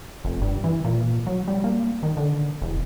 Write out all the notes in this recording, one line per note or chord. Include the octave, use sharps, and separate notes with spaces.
F1
G2
E3
A#2
F#3
G3
A#3
D#3
D3
E1